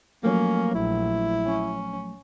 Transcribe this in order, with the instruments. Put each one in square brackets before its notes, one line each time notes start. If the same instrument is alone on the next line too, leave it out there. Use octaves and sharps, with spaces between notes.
[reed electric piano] F3 F#3 A3 [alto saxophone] A#3 [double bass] C#4
[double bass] A#1 [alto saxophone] E4
[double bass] C#4